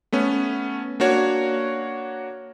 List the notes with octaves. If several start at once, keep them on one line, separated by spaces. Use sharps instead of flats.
A3 B3 C#4
A#3 D4 F#4 C#5 G#6